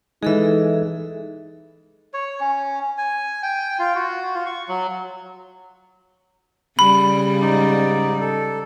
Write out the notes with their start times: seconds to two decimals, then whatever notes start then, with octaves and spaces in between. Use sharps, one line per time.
0.23 E3 G#3 D#4 G#4 A4 E5
2.14 C#5
2.40 C#4
2.98 G#5
3.43 G5
3.79 F4
3.95 F#4
4.35 F4
4.46 C#6
4.69 F#3
6.79 C#3 G3 B5
7.41 G#2 D#4 D5
8.21 A4